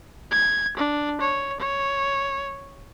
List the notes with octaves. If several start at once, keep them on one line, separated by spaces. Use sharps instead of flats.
G#6
D4
C#5
C#5